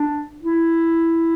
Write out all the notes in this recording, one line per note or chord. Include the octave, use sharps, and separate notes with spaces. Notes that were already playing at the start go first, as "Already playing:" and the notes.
Already playing: D4
E4